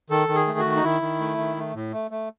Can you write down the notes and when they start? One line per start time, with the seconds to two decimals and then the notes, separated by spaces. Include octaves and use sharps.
0.10 D#3 A4
0.28 D#3
0.35 G#4
0.47 A3
0.59 F#4
0.65 D#3
0.76 D#4
0.83 D#3 E4
1.02 D#3
1.20 A3
1.38 D#3
1.57 A3
1.74 A2
1.93 A3
2.11 A3